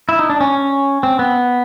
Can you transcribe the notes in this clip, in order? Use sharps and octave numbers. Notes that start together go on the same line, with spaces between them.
E4
D#4
D4
C#4
C4
B3